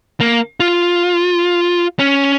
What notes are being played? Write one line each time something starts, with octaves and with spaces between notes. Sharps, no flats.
A#3
F4
C#4